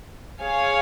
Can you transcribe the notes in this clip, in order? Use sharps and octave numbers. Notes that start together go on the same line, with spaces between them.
G#4 C#5 F5 G#5